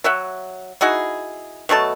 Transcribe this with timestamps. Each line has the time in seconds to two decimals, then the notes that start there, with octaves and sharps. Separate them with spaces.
0.04 F#3 E5 F#5
0.81 D#4 E4 F#4 G#4
1.69 B2 F#3 A3 A5